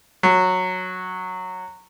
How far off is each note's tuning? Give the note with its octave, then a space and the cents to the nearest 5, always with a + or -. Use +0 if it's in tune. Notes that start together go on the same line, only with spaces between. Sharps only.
F#3 -10